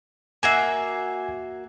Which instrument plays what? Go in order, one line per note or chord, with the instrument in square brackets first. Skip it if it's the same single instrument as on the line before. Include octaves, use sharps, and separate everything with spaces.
[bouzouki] A#3 F#4 E5 [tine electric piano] G#5 G#6 C7